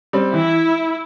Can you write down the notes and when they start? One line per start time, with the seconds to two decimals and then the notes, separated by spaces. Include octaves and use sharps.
0.13 G3 C4
0.34 E3 E4